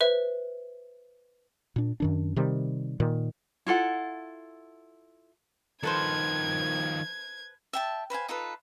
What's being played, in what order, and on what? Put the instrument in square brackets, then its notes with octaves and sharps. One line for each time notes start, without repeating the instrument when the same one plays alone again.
[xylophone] B4 C5 E5
[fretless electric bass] A#2 D4
F#2 D#3 D4
C3 D#3 G3
A#2 D#3
[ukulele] E4 F4 A4 F#5
[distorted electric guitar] D#3 F3 [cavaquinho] A4 B4 C5 [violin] G#6
[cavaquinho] E5 G5 A5
B4 C5 F5 G#5
D#4 F4 A4 B4